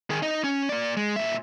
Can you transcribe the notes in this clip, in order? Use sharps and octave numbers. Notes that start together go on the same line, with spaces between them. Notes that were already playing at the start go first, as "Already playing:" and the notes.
D#3 G#4
D#4 D#5
C#4
A#3 D5
G#3
A#2 E5